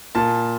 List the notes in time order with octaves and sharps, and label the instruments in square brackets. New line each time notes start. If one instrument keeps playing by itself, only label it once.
[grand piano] A#2 A5